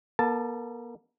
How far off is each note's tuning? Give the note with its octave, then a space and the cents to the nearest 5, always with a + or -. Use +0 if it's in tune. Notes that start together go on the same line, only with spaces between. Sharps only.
A#3 +45 A4 +45 A5 +0